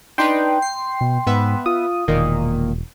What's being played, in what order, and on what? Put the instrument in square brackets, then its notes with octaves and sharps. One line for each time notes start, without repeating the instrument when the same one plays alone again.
[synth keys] D4 D#4 B4 [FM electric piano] G5 C6
[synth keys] C7
[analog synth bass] B2
[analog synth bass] G#2 [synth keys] B3 B4 E5
[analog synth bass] F4 [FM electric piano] D#6
[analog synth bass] E1 [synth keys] A#2 D#3 A#3